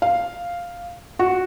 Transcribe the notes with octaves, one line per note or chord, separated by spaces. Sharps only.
F5
F#4